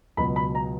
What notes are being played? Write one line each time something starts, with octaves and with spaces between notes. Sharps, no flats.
C#2 B2 F#3 B5
B5
A#5